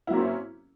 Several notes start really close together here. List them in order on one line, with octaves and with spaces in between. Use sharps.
E4 F#3 A#3 C4 C#4